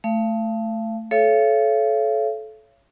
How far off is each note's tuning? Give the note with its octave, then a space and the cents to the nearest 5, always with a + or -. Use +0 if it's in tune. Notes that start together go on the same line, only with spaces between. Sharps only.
A3 +0 F5 -35
A4 -25 C#5 +0 F5 -40